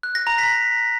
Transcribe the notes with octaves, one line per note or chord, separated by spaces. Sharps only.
F#6
A#6
A#5
B6